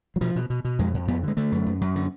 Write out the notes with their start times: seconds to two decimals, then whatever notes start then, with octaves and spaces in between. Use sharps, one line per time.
0.16 F#3
0.21 B2 F3
0.36 B2
0.50 B2
0.65 B2
0.79 F2 G#3
0.94 F2
1.08 F2 B3
1.23 D3 G#3
1.37 D3 A3
1.52 F#2
1.66 F#2
1.81 F#2
1.96 D3